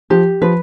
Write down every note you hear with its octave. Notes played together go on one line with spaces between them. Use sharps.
F3 G4
F3 B4